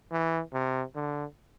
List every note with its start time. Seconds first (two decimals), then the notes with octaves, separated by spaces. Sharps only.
0.12 E3
0.53 C3
0.95 D3